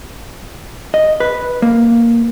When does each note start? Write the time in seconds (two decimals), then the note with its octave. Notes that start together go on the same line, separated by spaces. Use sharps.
0.94 D#5
1.20 B4
1.62 A#3